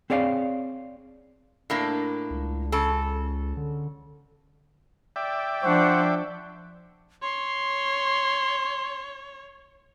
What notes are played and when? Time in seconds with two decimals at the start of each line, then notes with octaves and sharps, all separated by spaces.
0.10 C4 G#4 C#5 D5 F5
1.70 A2 A#3 D4
2.31 C#2
2.72 C#3 A4
3.57 D3
5.16 D5 E5 G5
5.63 F3 D4 C5 F#5 C#6
7.22 C#5 C6